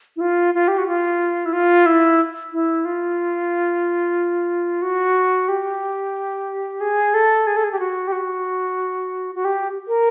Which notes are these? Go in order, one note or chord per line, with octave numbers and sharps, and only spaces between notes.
E4
F4
F4
G4
F#4
F4
E4
F4
E4
E4
F4
F#4
G4
G#4
A4
G#4
A4
G#4
G4
F#4
G4
F#4
F#4
G4
A#4